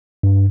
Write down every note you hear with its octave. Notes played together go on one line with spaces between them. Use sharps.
G2